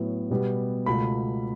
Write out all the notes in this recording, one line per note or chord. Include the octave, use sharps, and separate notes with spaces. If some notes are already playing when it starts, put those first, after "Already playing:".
Already playing: A2 F#3 B3
B2 G3 B3
C#2 B2 A3 B5